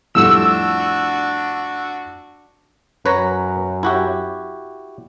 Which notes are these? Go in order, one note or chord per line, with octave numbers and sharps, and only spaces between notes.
F2 A2 G3 D4 F#4 E6
F#2 B4 C#5 A#5
E4 F#4 G4